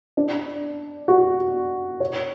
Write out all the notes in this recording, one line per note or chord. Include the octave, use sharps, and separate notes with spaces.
D4
F#4
C#5